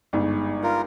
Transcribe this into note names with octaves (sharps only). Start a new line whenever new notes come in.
G1 G#2
F4 A#4